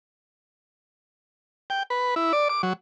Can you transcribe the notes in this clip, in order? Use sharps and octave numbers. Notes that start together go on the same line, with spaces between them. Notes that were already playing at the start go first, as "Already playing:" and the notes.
G5
B4
E4
D5
D6
F#3